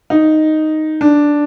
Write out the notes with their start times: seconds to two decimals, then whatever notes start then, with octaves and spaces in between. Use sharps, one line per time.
0.10 D#4
1.01 D4